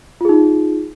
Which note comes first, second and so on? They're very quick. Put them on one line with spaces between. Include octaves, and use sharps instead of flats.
F4 G#4 D#4